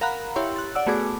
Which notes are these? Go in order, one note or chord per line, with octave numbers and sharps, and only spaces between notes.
A#4 F5 F#5 A#5 B5 F#6
E4 G4 C#5 C6
F#6 A6
D5 F#5 E6
A3 B3 F#4 G#4 D6